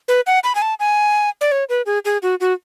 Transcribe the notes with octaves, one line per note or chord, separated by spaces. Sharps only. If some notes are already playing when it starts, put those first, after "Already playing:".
B4
F#5
B5
G#5
A5
G#5
D5
C#5
B4
G#4
G#4
F#4
F#4